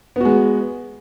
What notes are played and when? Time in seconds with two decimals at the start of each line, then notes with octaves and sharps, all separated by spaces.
0.16 B3
0.21 F#4
0.25 G#3